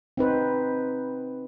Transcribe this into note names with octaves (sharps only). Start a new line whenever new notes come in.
C4 D#4 B4 C5